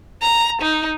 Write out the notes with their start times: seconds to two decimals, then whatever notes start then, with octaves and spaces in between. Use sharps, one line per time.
0.22 A#5
0.62 D#4